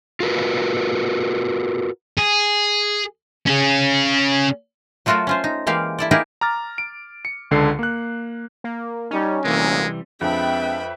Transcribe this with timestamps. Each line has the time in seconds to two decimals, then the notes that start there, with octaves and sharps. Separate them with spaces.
0.20 F4 F#4 A#4 B4
2.17 G#4
3.46 C#4 G#4
5.06 F#3 A3 F4 F#4 A4 A#4
5.27 C#4 F4 C5
5.44 D#4
5.67 E3 G#3 A#3 G4 F5
5.99 E4 A4 D5
6.11 A#3 D#4 E4 G4 G#4 A#4
6.41 A#5 D6 F6 A6
6.78 D7
7.25 C#7
7.51 C#2 D3 A4 C7
7.79 A#3 F#6
8.64 A#3
9.11 G3 C#4 D#4
9.44 D2 C3 E3 G3 G#3 A#3
10.21 F2 G#3 C4 D4 B4 E5 G5 B5